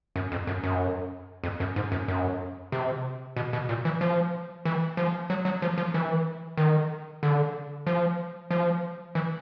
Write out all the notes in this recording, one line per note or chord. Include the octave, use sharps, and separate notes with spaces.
F#2
F2
F#2
F#2
F2
F#2
G#2
F#2
F#2
C3
B2
B2
A#2
E3
F3
E3
F3
F#3
F#3
F3
F3
E3
D#3
D3
F3
F3
E3